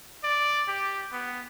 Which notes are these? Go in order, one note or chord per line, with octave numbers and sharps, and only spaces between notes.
D5
G4
B3